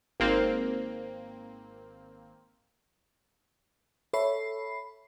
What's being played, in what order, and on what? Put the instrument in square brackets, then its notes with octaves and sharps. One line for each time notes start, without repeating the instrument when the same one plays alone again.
[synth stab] G#1 A#3 C4
[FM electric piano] A4 C#5 E5 B5 C7